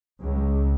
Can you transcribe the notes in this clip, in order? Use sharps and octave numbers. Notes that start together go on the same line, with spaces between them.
C#2